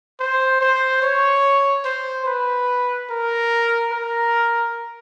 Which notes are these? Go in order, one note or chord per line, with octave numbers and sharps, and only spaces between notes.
C5
C5
C#5
C5
B4
A#4
A#4